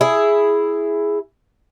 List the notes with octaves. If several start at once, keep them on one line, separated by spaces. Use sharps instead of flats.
E4 G#4